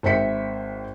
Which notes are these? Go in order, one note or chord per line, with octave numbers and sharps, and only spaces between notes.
G#1 C5 E5 G5 B6 C#7